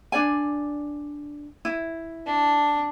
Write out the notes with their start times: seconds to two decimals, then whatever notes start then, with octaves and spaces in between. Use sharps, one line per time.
0.12 D4 D5 G#5
1.65 E4
2.27 D4